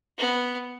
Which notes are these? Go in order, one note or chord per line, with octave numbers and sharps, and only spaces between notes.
B3